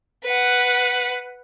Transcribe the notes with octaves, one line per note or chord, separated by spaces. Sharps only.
B4 F#5